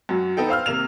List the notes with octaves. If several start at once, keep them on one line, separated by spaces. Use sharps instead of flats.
F#2 F#3
B3 D#4 A4 G5
C5 F5 E6 F6
C3 A#3 E7 F7